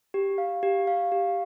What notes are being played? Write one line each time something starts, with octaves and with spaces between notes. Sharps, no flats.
G4
F5
G4
F5
G4